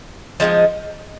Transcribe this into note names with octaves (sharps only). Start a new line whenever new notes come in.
F3 G#3 C4 D#4